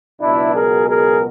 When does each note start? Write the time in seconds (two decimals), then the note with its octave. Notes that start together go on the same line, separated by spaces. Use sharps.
0.21 C#2 B2 F#3 D4 E4
0.55 G#4 A#4
0.88 G#4 A#4